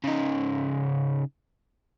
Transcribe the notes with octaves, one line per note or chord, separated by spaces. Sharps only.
C#3 D#4